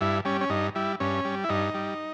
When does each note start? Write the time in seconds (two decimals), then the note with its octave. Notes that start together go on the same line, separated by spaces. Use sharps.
0.01 G2 E4
0.25 G3 C#4
0.41 C#4
0.50 G2 D#4
0.75 G3 E4
1.00 G2 C#4
1.25 G3
1.44 E4
1.49 G2 D#4
1.74 G3